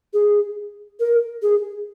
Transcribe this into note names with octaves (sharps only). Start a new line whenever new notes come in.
G#4
A#4
G#4